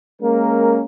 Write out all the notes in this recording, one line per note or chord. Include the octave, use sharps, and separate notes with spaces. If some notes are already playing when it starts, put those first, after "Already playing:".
G#3 A#3 C#4 A#4